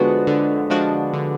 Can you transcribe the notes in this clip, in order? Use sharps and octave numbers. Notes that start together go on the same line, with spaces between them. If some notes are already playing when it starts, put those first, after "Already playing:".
Already playing: D3 F3 G#3 B3 D4 F#4
D3
F3 G#3 D4 F#4
D3